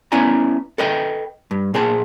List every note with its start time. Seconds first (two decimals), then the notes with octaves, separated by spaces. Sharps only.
0.12 B3 C#4 E4 D5 G#5 A#5
0.78 A4 B4 D#5 G5
1.51 G2
1.74 A#2 G#4 C5 A5